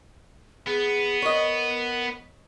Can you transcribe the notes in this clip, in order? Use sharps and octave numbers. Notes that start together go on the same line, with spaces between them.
B3 G#4
A#4 C#5 D#5